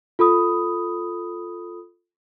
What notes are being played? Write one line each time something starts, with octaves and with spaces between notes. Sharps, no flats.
F4 A4 B5 D#6